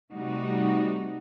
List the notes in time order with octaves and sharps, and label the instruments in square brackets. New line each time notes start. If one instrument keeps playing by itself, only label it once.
[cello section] C3 G3 A3 D#4 F#4